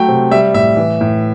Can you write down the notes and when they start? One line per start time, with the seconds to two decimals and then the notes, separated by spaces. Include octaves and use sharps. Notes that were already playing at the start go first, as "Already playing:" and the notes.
Already playing: F#3 A3 G5
0.08 C3
0.31 G3 E5
0.54 A2 E5
0.77 E3
1.01 A2